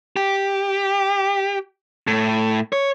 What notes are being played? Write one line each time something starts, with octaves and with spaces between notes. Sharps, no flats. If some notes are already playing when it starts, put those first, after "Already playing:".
G4
A2
C#5